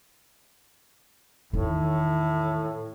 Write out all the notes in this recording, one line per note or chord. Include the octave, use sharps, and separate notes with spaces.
E2 A2 D#3